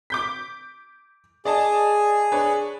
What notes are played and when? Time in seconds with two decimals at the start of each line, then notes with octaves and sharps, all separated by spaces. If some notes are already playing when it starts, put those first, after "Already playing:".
0.10 D6 G6 B6
1.45 G#4 D5 D#5 A5
2.32 D4 B4 C#5